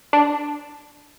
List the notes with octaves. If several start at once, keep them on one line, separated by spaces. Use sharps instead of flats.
D4